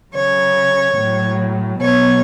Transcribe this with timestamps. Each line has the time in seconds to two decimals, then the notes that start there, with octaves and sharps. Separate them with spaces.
0.13 C#3 F#3 C#5
0.96 A2 F#3
1.79 B2 F#3 C#5